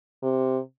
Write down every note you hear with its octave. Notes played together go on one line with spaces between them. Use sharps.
C3